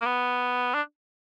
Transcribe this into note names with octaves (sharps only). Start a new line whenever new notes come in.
A#3
B3
D4